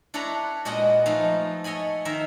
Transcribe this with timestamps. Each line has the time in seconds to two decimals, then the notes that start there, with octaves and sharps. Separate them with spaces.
0.14 D4 E4 A4 B4 C#5 A#5
0.65 A#2 G#3 B3 F#4 D#5 F#5
1.06 F3 A3 D#4 F5
1.64 A4 C#5 D#5 G#5 B5
2.05 D#3 A#4 C5 E5